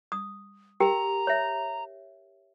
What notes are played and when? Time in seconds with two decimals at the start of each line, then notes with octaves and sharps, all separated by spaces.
0.12 D#6
0.80 G4 A#4 G5 A#5
1.27 C#5 E5